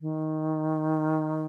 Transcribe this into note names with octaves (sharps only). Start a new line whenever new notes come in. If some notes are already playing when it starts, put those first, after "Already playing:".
D#3